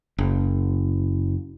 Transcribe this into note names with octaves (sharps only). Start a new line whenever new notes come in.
F#1